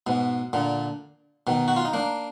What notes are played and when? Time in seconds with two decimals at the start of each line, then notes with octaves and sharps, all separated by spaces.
0.07 G#2 B2
0.53 A#2 D3
1.47 B2 D#3
1.68 F#4
1.76 F4
1.85 D#4
1.93 A#3 D4